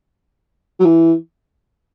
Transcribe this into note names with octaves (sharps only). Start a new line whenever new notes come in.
F#3
E3